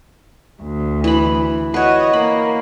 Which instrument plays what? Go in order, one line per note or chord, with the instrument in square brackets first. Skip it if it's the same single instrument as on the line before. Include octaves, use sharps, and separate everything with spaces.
[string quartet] D2
[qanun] E3 B5
[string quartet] F#4 D#5 [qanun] B4 C#5
[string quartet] A#3 [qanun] B5